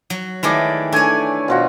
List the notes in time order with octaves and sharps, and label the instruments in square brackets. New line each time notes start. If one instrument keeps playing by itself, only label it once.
[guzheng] F#3
[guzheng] D#3 G#3 A3 [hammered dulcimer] E3 D5
[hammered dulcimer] A3 G#5 [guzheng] D4 C#5
[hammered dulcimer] B2 F3 F#4